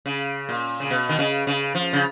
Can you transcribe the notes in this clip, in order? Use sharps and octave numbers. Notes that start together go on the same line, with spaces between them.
C#3
A#2
C#3
B2
D#3
C#3
C#3
F3
C#3